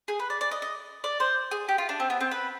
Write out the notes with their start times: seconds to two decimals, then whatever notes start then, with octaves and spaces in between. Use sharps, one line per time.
0.08 G#4
0.19 B4
0.30 D5
0.41 D5
0.51 D#5
0.62 D#5
1.04 D5
1.20 C5
1.51 G#4
1.68 G4
1.78 F4
1.89 D4
2.00 C4
2.10 B3
2.21 C4
2.31 B4